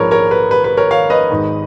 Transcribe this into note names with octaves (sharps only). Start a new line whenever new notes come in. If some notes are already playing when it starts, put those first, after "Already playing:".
Already playing: A#1 G#2 F3 G#3 A#4 B4 C#5
A#4 C#5
B4
B4
B4
A#4 C#5
C#5 F5
B4 D#5
G#1 G#2 D#3